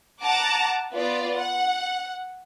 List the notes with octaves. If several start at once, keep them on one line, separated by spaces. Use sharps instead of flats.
F#5 A5 A#5 D6
B3 F4 D5
F#5